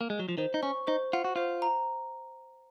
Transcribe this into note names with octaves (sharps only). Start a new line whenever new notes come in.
A#3
G#3
F#3
F3
D#3 C5
D#4
C#4 C#6
D#4 C5
F4 F#5
F#4
F4 C5
A#5